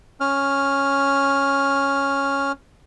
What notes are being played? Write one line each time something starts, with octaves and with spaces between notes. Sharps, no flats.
C#4 F6